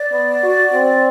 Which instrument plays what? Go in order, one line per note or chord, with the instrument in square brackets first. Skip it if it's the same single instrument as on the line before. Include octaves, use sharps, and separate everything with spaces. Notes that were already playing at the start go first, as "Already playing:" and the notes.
Already playing: [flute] D5
[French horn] B3
F#4
C4